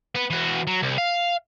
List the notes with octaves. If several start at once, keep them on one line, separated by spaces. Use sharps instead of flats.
B3 B4
E3 F#4
F#3
C2
F5